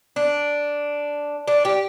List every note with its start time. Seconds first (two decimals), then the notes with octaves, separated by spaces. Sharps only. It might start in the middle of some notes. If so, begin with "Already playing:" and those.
0.16 D4
1.48 D4
1.65 G4